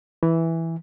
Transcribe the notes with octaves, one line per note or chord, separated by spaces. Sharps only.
E3